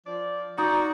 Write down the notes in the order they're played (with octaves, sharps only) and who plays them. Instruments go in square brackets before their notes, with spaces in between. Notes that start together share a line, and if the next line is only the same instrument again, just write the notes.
[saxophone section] F3 D5
[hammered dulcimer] D#4 [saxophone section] F#4 D5